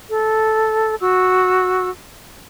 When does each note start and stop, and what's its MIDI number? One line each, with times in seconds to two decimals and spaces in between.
0.09 0.96 69
1.01 1.90 66
1.01 1.90 88